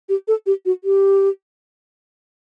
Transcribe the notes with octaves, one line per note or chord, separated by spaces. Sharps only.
G4
A4
G4
F#4
G4